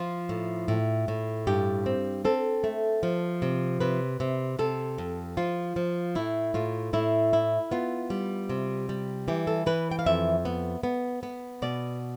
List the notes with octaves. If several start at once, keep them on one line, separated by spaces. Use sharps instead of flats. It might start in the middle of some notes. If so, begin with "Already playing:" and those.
Already playing: F3 F4
A2
A2
A2
G2 G4
C4
C4 A4
A3
F3
C3
C3 B4
C3
C3 A4
F2
F3 F4
F3
A2 E4
A2 F4
A2 E4
E4
B3 F4
G3
C3
G3
E3 G4
A4
E3 B4
G5
F5
F2 E5
B3
B3
B3
B2 D5